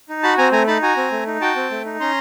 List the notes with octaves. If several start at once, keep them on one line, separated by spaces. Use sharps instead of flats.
D#4
F#4 A5 B5
C4 G#5 A#5
A3 G#5 A#5
D#4 A5 B5
F#4 G#5 A#5
C4
A3
D#4
F#4 G5 A5
C4
A3
D#4
C#4 A#5 C6